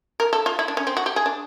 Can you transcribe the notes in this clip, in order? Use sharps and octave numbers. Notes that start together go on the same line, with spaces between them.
A#4
A4
F4
E4
D4
C#4
C4
F#4
G4
G#4
D4